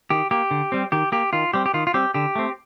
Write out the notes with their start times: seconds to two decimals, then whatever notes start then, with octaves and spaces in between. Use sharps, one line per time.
0.10 D#3 G4
0.31 A#3 G4
0.51 D3
0.72 G3 C4
0.92 D#3 G4
1.12 A#3 G4
1.33 D#3 F4
1.53 G3 C4 G4
1.66 G4
1.74 D#3 F4
1.87 F4
1.94 G3 C4 G4
2.14 D3 G4
2.36 A3 C4